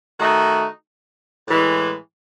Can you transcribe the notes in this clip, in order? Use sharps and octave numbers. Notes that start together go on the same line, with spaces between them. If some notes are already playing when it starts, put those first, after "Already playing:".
D#3 A3 D#4 F#4
A2 E3 G#3